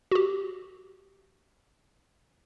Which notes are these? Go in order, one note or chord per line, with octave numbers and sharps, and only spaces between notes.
F#4 G4